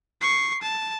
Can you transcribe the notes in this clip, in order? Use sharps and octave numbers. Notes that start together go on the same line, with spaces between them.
C#6 C7
A5